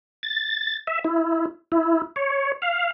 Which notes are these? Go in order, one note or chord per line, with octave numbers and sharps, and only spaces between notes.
A6
E5
E4
E4
C#5
F5